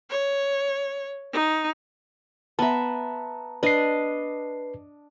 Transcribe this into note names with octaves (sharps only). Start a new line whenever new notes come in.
C#5
D#4
B3 E5 A5 A#5
D4 B4 D#5 C7